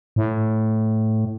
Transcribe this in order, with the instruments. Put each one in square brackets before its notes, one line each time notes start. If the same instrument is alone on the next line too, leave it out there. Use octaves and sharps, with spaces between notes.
[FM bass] A2